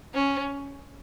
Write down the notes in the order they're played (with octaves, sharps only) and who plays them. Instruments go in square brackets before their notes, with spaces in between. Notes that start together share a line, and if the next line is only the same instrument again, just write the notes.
[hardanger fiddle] C#4